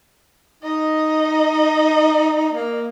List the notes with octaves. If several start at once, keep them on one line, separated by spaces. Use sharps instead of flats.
D#4 D#5
A#3